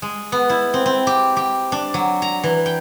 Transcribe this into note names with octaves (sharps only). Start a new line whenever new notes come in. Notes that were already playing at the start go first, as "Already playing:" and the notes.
G#3
B3
E4
C4
C4
G4
G4
D4
F#3
A#5
E3
G5